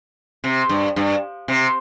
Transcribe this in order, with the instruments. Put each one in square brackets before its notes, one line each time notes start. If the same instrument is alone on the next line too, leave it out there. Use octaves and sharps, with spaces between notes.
[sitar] C3
G2
G2
C3